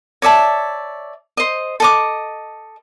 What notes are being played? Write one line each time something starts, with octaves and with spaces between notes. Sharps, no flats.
C#5 D5 E5 A5
C5 D#5
A4 D#5 D6